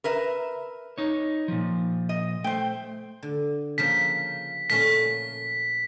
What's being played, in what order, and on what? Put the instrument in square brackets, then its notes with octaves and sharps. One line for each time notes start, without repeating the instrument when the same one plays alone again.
[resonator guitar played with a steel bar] A#4 B4 E5
[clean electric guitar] D#4 C#5
A#2 F3
[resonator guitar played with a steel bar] D#5
[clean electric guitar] A3 [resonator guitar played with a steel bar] C5 G5
[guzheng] D3
[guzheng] C#3 F3 A#3 [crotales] B6
[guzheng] A#2 A3 C#4 [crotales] B6